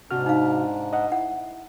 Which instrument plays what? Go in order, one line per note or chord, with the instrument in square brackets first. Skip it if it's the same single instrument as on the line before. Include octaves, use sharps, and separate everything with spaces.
[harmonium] G#2 D4 [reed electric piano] C3 F#4 F6
[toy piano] D#4 F5
[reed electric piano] D#5 F#5
[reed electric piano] E4 [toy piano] F#5